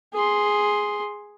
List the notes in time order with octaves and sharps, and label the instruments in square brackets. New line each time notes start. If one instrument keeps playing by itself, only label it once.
[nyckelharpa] G#4 C6